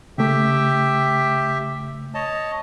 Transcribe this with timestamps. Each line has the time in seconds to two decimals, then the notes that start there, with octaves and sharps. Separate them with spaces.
0.18 C#3 A3 G4 E5 G5
2.14 C#5 D#5 A5